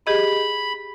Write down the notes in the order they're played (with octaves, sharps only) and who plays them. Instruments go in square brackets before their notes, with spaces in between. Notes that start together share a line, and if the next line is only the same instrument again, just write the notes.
[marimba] G4 G#4 D#5 [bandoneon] B5